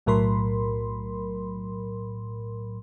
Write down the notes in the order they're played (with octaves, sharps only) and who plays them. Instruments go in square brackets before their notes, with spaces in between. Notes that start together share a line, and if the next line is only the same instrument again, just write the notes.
[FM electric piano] B1 A2 F#3 A#4 B5 C6